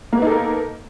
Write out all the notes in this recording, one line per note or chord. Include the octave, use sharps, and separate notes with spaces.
A#3 B3 D#4 A4 A#4